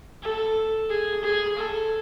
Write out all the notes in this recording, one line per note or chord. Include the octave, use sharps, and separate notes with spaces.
A4
G#4
G#4
A4